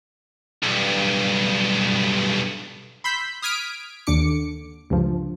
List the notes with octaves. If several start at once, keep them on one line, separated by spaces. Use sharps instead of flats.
B1 G2
B5 C6 E6 G6 B6
D#6 F6 G#6 B6 D7
D#2 D3 D6 C#7
C#2 G2 F3